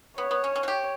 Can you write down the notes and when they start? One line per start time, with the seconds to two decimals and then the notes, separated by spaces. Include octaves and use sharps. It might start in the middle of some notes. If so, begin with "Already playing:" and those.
0.18 B3 C#5
0.31 B3
0.44 C#4
0.56 C#4
0.63 F#4
0.68 G4